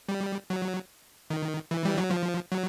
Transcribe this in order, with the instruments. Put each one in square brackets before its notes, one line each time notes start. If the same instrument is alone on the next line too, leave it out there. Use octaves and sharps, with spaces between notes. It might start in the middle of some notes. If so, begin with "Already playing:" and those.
[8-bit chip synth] G3
F#3
D#3
E3
G3
F#3
F3
F#3